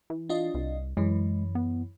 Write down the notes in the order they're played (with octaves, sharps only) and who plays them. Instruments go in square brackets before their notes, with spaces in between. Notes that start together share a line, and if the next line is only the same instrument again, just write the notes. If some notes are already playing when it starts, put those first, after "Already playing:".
[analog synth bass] E3
[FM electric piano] D4 F4 D#5
[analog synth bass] C2
[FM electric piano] F#2 E3 [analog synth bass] G#3
[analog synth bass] B3